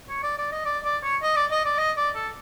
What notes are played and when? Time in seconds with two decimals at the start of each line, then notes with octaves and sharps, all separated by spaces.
0.10 C#5
0.23 D5
0.38 D5
0.52 D#5
0.66 D5
0.84 D5
1.03 C#5
1.22 D#5
1.36 D5
1.51 D#5
1.65 D5
1.78 D#5
1.97 D5
2.15 A4